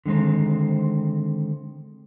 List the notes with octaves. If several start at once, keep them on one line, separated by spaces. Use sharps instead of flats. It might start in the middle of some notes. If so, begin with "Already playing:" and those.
D3 D#3 G#3 C4